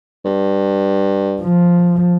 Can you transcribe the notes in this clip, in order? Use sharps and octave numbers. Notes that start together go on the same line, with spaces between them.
G2
F3